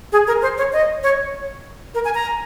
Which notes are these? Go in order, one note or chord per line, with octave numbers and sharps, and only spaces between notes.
G#4
A#4
C5
C#5
D#5
C#5
A#4
G#5
A#5